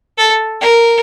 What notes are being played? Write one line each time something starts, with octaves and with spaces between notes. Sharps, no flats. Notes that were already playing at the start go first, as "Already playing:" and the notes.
A4
A#4